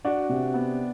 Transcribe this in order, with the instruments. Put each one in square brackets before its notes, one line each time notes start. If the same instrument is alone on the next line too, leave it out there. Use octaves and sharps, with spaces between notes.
[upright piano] D4 [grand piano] F#4
[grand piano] C3
B3